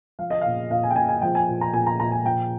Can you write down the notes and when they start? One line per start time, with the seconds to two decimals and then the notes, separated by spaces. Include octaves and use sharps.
0.19 F3 F5
0.30 D#5
0.41 A#2 F5
0.71 A#2 F5
0.83 G#5
0.90 G5
0.96 A#2 G#5
1.09 G#5
1.22 F3 G5
1.35 G#5
1.48 A#2
1.61 A#5
1.73 A#2 G#5
1.87 A#5
2.00 A#2 A#5
2.12 G#5
2.25 F3 G5